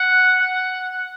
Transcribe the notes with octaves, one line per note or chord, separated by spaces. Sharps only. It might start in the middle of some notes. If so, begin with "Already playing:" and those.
Already playing: F#5
F#5